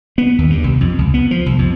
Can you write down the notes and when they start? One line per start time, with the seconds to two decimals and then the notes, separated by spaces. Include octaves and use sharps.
0.18 B3
0.38 D#2
0.50 G2
0.64 C2
0.81 F2
0.98 C#2
1.14 B3
1.31 F3
1.46 C2
1.59 F2